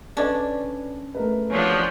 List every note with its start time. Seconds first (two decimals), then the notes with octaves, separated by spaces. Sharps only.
0.17 C#4 D4 A4 B4 D5
1.15 A3 A#4 B4
1.51 F3 D4 F#4 G#4 C#5